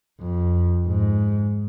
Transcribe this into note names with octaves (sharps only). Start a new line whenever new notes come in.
F2
G#2